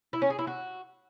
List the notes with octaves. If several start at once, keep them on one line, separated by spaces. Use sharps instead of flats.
E4
C#4
G#4
E4
F#4